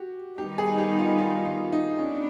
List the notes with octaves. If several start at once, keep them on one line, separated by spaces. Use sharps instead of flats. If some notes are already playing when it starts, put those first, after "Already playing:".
Already playing: F#4 G4
D#3 G3 B3 D#4 G4
G#4
G4
F4
F4
F4
D#4
B3 C#4 D4